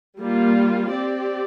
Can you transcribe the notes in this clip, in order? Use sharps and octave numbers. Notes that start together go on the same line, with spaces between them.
G3 A#3 F4
C4 G4 D5